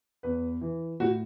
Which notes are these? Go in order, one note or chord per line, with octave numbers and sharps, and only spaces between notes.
E2 B4
E3
A2 F#4